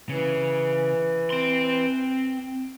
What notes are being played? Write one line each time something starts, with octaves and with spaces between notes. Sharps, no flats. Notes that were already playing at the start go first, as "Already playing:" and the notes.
C#3 E3
C4 C6